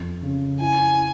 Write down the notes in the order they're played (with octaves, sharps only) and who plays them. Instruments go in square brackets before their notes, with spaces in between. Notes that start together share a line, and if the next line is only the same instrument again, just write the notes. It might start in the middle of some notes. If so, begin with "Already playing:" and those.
Already playing: [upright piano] F2
C#3
[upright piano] E4 [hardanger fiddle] G#5